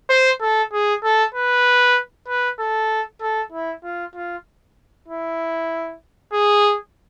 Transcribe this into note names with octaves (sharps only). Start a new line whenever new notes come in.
C5
A4
G#4
A4
B4
B4
A4
A4
E4
F4
F4
E4
G#4